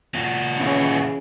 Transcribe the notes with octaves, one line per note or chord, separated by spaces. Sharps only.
A#2 F#4
C#3 E3